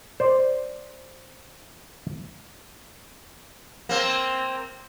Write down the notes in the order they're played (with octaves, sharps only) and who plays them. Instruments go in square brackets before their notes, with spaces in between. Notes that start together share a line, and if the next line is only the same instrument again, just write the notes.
[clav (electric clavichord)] C5 D5
[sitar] A#3 C4